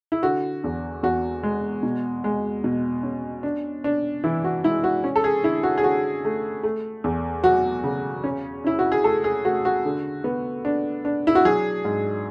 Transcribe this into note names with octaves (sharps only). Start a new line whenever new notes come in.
E4
D3 F#4
E2
E2 F#4
G#3
B2
G#3
B2
C#4
D4
D4
E3 E4
F#4
G#3 E4
F#4
C#4
A4
G#4
D3 E4
F#4
G#4
D3 F#4
A3
A3
E2
F#3 F#4
C#3
C#4
C#4 E4
F#4
G#4
A3 A4
G#4
A3 F#4
F#4
D3
B3
D4
D4
E4
F#4
F#3 G#4
G#2